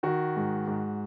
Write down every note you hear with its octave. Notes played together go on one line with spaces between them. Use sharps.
D#3 F#4
G#2
G#2